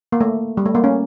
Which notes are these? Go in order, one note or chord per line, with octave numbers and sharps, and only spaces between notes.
A#3
A3
G3
A3
A#3
C#4